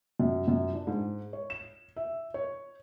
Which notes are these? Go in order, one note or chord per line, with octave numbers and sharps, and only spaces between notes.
F#2
F#2
D4
G#2
C#5
E7
E5
C#5